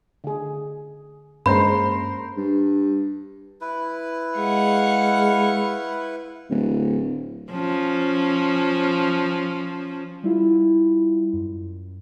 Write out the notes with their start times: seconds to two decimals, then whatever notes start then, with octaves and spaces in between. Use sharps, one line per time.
0.24 D3 G#4
1.46 G2 G#3 A#3 C#4 A#4 C5 B5 C6
2.37 G2
3.61 E4 B4
4.37 G#3 F5 F#5 C#6
6.50 D1
7.51 F3 C#4
10.23 G3 E4 F4
11.33 F#2